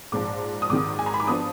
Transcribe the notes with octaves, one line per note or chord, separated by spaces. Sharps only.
A#1 G#2 F3 D6
D#6
G#1 G#2 D#3 D6
G#5
A#5
B5
D6
F3 B3 D4 D#6